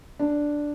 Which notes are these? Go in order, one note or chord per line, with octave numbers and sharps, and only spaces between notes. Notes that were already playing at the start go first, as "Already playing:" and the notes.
D4